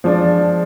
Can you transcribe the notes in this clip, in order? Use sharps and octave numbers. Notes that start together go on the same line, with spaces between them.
F3 G#3 D4